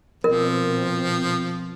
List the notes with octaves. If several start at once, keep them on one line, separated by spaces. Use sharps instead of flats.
B2 F3 C4 A#4